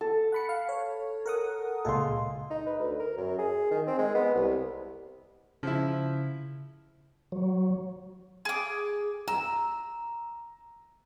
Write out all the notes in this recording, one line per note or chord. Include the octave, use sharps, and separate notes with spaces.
A4
F#5 B5 C#7
F5
C#5
A#4 F#5 D#6
C#2 A#2 G#3 A4 F5 C6
D#4
B4
D2
A#4
F#2
G#4
D#3
C4
G#3
B3
C2
C#3 F3 E4
F#3
G#4 D6
A#5 E6